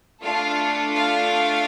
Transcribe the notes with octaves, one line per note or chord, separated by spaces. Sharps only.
A3 D4 F4 A4 F5
F5